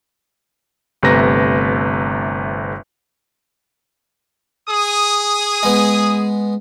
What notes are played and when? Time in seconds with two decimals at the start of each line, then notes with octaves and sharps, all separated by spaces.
1.03 G1 C3 A3 B4 A#5 A#6
4.68 G#4 D#6
5.63 G#3 B3